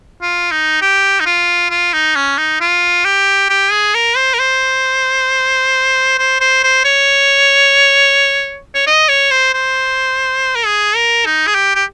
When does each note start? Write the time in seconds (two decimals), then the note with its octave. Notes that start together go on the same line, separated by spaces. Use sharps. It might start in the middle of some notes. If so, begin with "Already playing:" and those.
0.22 F4
0.51 D#4
0.81 G4
1.20 D#4
1.26 F4
1.70 F4
1.93 D#4
2.15 C#4
2.38 D#4
2.60 F4
3.05 G4
3.49 G4
3.72 G#4
3.94 A#4
4.16 C5
4.34 A#4
4.39 C5
6.18 C5
6.40 C5
6.63 C5
6.85 C#5
8.75 C#5
8.87 D#5
9.09 C#5
9.31 C5
9.53 C5
10.55 A#4
10.65 G#4
10.95 A#4
11.25 D#4
11.47 G#4
11.55 G4
11.75 G4